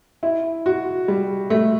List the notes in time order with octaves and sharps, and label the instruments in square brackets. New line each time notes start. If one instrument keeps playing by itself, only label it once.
[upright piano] E4
F#4
G3
A3